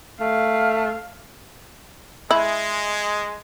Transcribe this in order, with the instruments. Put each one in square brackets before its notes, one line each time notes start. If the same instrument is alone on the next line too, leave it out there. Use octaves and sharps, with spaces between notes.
[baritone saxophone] A3 [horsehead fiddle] F5
[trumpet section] G#3 [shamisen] E4